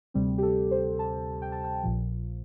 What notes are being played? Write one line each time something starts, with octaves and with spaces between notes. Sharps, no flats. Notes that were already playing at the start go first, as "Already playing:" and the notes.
D2 C3 G3 C4
G4
A4
C5
A5
G5
A5
G5
A#1 A#2 F3